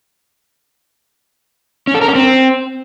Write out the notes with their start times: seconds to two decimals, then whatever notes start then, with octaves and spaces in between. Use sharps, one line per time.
1.87 C#4
1.94 A4
2.01 A#4
2.08 C#4
2.15 C4